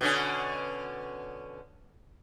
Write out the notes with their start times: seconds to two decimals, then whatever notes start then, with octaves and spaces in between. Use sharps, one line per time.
0.01 B2 D3 C#4